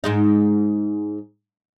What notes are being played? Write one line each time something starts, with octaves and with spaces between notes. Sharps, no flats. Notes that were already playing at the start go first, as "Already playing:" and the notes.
G#2 G#3 D#4